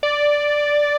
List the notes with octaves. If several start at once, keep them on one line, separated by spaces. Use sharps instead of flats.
D5